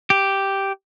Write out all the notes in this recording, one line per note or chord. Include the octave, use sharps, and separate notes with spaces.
G4